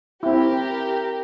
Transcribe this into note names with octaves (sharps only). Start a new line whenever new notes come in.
C4 E4 G4 A#4